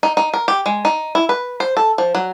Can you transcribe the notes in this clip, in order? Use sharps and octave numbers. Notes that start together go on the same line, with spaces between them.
D#4
D#4
A#4
G4
G#3
D#4
E4
B4
C5
A4
F3
F#3